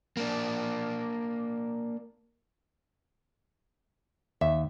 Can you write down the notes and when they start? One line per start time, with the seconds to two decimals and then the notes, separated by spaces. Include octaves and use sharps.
0.17 A#3 D4
4.41 D#2 E5